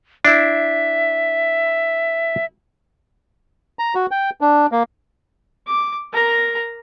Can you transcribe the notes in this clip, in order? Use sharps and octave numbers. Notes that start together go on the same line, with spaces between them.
D4 E4 E5
A#5
F#4
G5
D4
A#3
D6
A#4 A#5